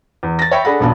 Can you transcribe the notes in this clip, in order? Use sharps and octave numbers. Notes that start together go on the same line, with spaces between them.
E2
A6 A#6
C#5 E5 G5 B5 C#6
D4 G#4 A4 F#5 B5
D#1 B1 B3 D4 A5